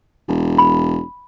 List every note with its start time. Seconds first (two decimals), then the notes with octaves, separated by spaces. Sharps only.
0.28 E1
0.58 B5